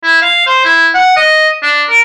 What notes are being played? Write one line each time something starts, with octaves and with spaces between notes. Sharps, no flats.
E4
F5
C5
E4
F#5
D#5
D4
A#4